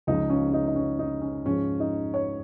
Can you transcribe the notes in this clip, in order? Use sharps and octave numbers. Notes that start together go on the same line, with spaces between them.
C#2 C#3 F3 G#3 D#4
C#4
C#4
D#4
D#4
C#4
D#4
C#4
G#2 F3 G#3 C#4
D#4
C#5